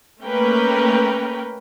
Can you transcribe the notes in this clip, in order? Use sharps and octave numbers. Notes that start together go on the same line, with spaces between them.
A3 A#3 C#4 A#4 B4 G5